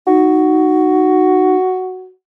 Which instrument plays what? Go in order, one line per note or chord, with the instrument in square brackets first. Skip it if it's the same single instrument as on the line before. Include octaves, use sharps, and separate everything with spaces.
[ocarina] D#4 [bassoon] F#4